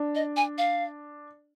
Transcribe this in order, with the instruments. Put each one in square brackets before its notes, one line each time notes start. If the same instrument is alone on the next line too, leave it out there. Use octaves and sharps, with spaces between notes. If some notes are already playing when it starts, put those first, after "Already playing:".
Already playing: [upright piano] D4
[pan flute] D#5
G#5
F5